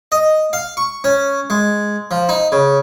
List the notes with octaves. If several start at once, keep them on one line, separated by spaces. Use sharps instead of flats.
D#5
F5
C#6
C#4
G#3
F3
D#4
C#3